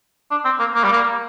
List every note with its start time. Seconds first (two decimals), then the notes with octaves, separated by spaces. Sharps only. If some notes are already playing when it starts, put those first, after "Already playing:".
0.31 D4
0.45 C4
0.59 A#3
0.75 A#3
0.84 G3
0.92 A#3